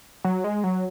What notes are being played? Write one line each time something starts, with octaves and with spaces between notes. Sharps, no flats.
F#3
G#3
F#3